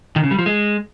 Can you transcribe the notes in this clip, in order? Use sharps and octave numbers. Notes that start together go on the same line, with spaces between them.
D#3
C#3
G3
F3
G#3